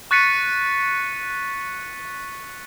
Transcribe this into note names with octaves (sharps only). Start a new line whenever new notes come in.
C#6 F#6 A6 B6 C#7 D#7